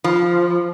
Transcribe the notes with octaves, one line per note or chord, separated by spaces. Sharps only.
F3